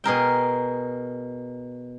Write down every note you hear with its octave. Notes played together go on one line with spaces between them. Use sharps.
B2 G#4 A#4 G5